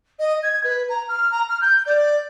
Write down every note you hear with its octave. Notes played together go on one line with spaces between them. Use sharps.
D#5
G#6
B4
A#5
F6
A#5
F6
G6
D5